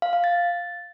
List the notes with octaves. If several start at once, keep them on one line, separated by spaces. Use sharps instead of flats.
F5
F5
A6